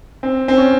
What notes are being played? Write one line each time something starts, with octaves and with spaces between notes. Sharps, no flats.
C4
C4
C#4